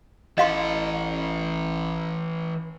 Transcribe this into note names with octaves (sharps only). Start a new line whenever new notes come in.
A1 E3 A4 D#5 F5 C6